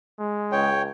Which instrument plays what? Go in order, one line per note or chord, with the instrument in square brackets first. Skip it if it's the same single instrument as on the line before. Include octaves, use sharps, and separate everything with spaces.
[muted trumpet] G#3
[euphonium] C#2 [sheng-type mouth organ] C#5 G5